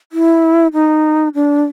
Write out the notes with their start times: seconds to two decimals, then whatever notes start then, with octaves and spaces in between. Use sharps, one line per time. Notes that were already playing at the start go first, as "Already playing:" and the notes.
0.12 E4
0.73 D#4
1.35 D4